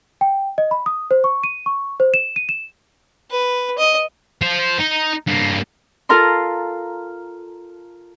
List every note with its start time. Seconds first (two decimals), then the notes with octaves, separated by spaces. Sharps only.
0.21 G5
0.58 D#5
0.71 B5
0.86 D#6
1.11 C5
1.24 C#6
1.44 D#7
1.66 C#6
2.00 C5
2.14 E7
2.36 D#7
2.49 E7
3.31 B4
3.78 D#5
4.42 F4 C5
4.79 D#4
5.27 G2 A#3
6.09 F4 A4 A#4 F5 A#5 C6